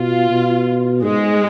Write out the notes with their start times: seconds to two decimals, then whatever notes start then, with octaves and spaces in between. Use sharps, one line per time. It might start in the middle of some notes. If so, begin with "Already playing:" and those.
Already playing: B2 F4
0.30 B2
1.03 G#2 G#3